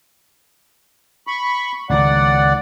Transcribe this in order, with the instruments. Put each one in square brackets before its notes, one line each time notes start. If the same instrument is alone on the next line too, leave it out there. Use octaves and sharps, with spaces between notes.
[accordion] B5 C#6
[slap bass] C#2 D#3 [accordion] D5 F#5